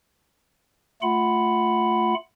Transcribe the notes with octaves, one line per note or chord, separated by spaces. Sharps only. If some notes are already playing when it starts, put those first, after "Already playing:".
A3 F4 F#5 B5